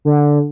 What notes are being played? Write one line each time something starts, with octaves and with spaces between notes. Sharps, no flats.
D3